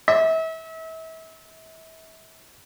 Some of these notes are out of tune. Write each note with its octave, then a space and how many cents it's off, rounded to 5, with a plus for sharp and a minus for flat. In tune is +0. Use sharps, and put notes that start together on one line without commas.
E5 -35